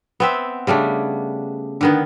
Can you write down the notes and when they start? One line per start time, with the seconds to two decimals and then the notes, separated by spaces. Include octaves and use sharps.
0.20 B3 C4 E5
0.67 C#3 G3 A3 D4
1.81 D3 D#3 B3